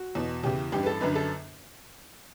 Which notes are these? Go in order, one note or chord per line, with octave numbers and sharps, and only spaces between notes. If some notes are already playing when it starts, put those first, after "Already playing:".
Already playing: F#4
E2 B2
E2 C#3 E3 G4
A1 G2 E3 G4
B4
A4
G1 F#2 D3 B4
A4